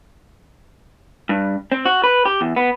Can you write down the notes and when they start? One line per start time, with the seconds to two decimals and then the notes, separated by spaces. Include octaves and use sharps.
1.29 G2
1.72 C4
1.86 F#4
2.04 B4
2.25 G4
2.41 E2
2.56 B3